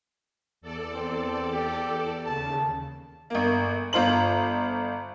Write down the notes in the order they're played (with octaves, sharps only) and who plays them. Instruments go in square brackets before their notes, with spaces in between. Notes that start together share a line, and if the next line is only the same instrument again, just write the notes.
[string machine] E2 A4 D5
[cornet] C4
G4
[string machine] D#2 C#3 [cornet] A5
[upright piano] G1 A#3
G1 F4 C5 F#7